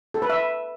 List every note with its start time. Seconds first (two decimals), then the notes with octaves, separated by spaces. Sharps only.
0.14 A4
0.22 B4
0.30 E5